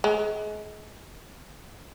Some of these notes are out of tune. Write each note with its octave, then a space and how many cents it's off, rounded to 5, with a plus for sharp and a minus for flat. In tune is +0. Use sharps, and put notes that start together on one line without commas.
G#3 +30